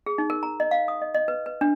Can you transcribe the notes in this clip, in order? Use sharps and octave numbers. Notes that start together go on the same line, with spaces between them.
G#4
D#4
A#4
A#5
D#5
F5
D#6
D#5
D#5
B4
B4
D4